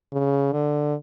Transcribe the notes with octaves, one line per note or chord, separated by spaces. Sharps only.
C#3
D3